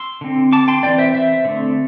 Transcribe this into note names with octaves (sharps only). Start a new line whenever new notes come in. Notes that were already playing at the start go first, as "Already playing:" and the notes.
Already playing: C6 E6
D3 C4
A5 D6
G5 C6
E3 C4 D5 G5
C5 E5
C5 E5
D3 A3 C4